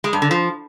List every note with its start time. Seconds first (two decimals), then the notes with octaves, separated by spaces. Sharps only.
0.04 G#3
0.13 G2
0.22 D3
0.31 F3